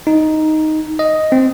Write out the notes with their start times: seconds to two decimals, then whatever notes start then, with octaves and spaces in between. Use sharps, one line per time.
0.07 D#4
0.99 D#5
1.32 C4